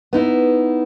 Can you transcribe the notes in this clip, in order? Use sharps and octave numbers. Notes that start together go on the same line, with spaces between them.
B3 D#4 E4